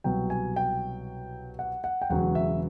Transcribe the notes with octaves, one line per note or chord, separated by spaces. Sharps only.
C2 B2 F#3 G5
G#5
G5
F#5
F#5
G5
E1 E2 C#3 F#3 F#5
E5